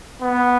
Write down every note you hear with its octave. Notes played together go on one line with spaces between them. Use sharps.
B3